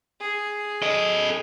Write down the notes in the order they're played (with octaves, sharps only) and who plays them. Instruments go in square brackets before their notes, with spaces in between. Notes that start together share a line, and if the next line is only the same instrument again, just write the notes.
[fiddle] G#4
[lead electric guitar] A4 D#5